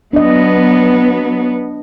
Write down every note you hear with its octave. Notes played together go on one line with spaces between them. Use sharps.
F#3 B3 D4 D#5